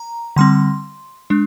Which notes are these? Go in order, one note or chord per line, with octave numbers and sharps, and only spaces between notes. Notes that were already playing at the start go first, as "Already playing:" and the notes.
Already playing: A#5
D3 G3 C4 C6
G#3 D4